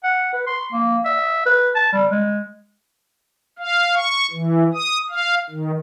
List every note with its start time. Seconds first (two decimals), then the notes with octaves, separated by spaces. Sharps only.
0.04 F#5
0.33 B4
0.47 C6
0.72 A#3
1.05 E5
1.46 B4
1.75 A5
1.93 G3
2.11 G#3
3.59 F5
3.95 C#6
4.31 E3
4.74 D#6
5.10 F5
5.50 D#3